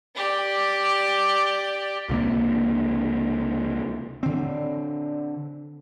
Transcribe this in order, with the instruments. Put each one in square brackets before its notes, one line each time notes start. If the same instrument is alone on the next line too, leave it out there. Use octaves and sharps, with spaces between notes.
[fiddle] G4 D5
[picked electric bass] C#2 C3 A#3
[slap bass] D3 C4